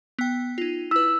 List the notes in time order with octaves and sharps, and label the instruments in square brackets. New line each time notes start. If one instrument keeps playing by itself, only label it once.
[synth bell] B3 G5
D#4 F4
[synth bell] E4 B4 [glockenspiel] E6